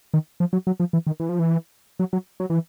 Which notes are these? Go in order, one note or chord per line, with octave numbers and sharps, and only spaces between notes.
D#3
F3
F#3
F#3
F3
E3
D#3
E3
F3
E3
F#3
F#3
F#3
E3